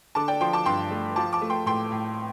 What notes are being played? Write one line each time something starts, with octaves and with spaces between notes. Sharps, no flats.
D3 A5 D6
D5 G5
F3 G5 C6
A5 D6
G2 G5 C6
A3
F3 A5 D6
A5 D6
A3
G5 C6
A2 G5 C6
A2